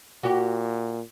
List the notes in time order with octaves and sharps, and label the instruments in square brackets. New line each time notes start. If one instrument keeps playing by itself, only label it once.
[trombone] A#2 [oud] F#4 G4